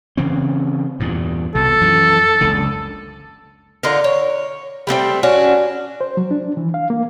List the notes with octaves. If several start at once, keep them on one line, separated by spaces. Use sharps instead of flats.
C#3 E3 C4
E2 G2 A#2
C2 B2 A4
F#2 E3 F3
F#1 C#2 D3
D3 D#4 F4 A#4
C#5
G3 A3 B3 C4
C#4 D4 F#4
C5
F#3
D4
E3
F5
A#3